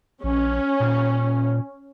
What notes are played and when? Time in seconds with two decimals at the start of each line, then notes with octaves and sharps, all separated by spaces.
0.23 A#1 C#4
0.80 A#2